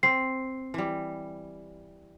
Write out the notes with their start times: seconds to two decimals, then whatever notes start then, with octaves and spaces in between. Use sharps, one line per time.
0.03 C4 C7
0.74 E3 G3